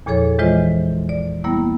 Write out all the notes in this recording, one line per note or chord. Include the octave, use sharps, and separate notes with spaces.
E2 A#2 F3 G#4 A4 C#5
E3 G#3 F4 C5 D#5
D5
G3 A#3 B3 E4